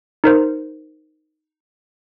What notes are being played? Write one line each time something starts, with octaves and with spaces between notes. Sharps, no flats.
D#4 A#4 C5